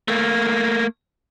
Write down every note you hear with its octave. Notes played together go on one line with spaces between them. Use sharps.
A3 A#3